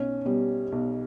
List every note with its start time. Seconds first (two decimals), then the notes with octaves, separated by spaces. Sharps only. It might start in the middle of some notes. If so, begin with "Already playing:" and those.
Already playing: B1 C#4
0.25 B2 G3
0.72 B1